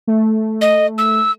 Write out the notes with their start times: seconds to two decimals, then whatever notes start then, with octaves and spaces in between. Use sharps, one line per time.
0.07 A3
0.61 D#5
0.98 E6